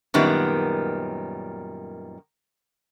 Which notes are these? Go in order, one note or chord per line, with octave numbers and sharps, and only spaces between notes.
F#2 A#2 D#3 G3 B3